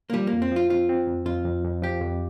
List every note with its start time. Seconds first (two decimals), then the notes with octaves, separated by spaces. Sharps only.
0.10 A#3
0.13 F3 G3
0.27 A#3
0.33 F2
0.42 C4
0.52 F3 F4
0.70 C4 F4
0.89 C4
1.07 F2
1.26 F2 F4
1.45 F2
1.64 F2
1.82 F3 G4
2.01 F2